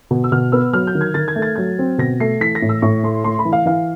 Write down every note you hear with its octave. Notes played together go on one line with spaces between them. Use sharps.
B2
E6
B2 F6
B3 E6
F#3 F6
G6
D#3
G#6
D#3 A6
G#6
A3
A6
F#3 G#6
C4
B2 A#6
A3 C7
E3 B6
A#6
A2
E6
A2 C#6
A3 C6
A3 C6
B5
E3
F5
E3 F5